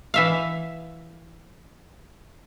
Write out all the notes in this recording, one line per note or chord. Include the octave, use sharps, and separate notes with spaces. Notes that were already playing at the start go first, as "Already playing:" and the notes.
E3 E5 F5